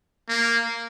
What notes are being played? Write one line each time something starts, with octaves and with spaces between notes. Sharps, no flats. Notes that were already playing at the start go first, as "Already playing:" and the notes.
A#3